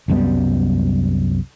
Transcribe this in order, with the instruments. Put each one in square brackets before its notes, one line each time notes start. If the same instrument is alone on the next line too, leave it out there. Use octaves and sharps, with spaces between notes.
[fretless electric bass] C2 F#2 G3 B3